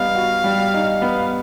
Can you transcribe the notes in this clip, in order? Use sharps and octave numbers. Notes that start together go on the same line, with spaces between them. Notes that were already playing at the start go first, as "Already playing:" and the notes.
Already playing: G3 B3 D#4 F5
F#4
G3
D#4
B3